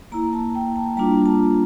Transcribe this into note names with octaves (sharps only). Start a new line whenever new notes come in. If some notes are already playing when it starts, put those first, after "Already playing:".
A#3 E4 A#5
A5
G5
A5
G3 A#3 D4 F4 A#5
A5